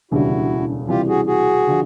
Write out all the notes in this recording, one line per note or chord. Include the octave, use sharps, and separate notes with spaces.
E1 D2 C#3 E3 G3 E4 F#4
C3 E3 G3 F4 G4
F#4 G#4
F#4 G#4
D3 F3